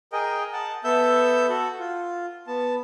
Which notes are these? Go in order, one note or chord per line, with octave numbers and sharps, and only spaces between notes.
G#4 A#4 D#5 G5
F#5 A5
B3 A4 E5 E6 G6
F#4 A4 F#5
F4
B3 A5